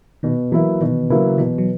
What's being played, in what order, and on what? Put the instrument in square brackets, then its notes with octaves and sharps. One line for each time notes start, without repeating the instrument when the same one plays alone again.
[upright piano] B2 [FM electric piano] D#3
[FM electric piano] E3 [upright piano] F#3 A#3 E4 B4
[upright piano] B2 [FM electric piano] D#3
[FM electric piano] C#3 [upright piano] F#3 A#3 E4 B4
[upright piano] B2 [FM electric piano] E3
[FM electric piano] F#3